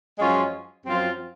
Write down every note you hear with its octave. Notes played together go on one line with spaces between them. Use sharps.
F#2 F3 G#3 C#4 F4
F#2 F3 C4 F4